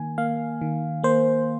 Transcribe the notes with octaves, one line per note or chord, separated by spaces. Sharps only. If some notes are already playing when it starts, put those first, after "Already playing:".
Already playing: D#3 A#3 G#5
A#3 F5
D#3
A#3 C5